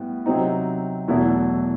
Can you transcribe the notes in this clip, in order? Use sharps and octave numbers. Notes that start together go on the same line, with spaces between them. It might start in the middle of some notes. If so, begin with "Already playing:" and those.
Already playing: A2 G3 B3
C3 F#3 C4 D#4
E2 B2 F#3 A3 E4